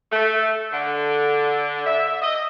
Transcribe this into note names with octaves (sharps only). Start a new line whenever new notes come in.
A3
D3
E5
D#5